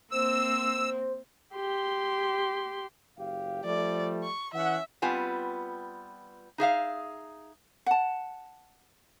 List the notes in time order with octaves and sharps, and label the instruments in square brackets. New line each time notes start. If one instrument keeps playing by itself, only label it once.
[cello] A#3 C4 [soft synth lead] C5 [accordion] E6
[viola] G4 C6
[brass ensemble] F#1 G4 F5
[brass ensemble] F3 G3 A3 [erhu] D5
[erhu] C#6
[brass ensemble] E3 C#4 F#5 [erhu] E5
[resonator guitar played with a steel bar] G3 B3 C4 F4 G#5
D#4 G#4 E5 F5
[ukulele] F#5 A5